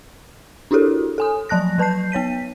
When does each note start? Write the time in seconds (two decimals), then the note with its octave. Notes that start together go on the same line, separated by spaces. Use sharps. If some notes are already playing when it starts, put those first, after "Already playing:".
0.71 D4 E4 F#4 G4 A4 A#4
1.18 A4 G#5 D#6
1.49 F3 F#3 A5 F#6 A#6
1.78 F#3 B4 A5 G6 C7
2.12 B3 C#5 B6 D#7